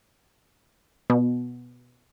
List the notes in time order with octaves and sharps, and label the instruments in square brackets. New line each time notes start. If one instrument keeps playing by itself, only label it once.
[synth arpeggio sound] B2